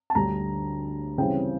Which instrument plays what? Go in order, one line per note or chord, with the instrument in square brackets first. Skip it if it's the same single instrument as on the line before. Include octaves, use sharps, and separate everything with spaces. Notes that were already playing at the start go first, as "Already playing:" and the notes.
[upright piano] A5
D2 D3 G3 A#5
C#3 E3 G3 C4 G5